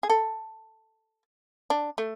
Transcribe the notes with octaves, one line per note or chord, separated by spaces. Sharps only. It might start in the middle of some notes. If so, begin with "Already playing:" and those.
G#4
A4
D4
A3